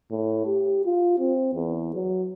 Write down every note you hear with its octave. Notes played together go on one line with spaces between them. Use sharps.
A2
G4
F4
C4
E2
F#3